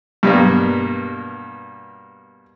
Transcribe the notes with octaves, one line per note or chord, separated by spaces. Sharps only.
G2 B2 G3 A#3